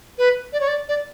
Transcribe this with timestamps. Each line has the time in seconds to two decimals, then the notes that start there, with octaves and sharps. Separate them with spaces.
0.18 B4
0.53 D5
0.61 C#5
0.68 D5
0.89 D5